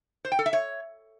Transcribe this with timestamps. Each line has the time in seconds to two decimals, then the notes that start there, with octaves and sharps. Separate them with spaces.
0.25 C5
0.32 G5
0.39 A4
0.46 E5
0.53 C#5